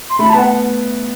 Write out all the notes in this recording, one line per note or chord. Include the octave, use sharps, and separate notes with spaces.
C6
A3 B5
A5
B3
F#5